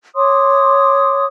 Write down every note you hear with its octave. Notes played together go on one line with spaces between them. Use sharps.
C#5 C6 D6 D#6